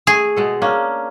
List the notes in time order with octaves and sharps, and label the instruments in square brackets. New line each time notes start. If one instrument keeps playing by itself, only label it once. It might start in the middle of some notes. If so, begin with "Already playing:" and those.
[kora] A3 [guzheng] G#4
[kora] B2 G#3 A4
A#3 C#4 D4